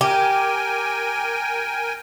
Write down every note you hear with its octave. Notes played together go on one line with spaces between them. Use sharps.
G4 A#4 G5 G#5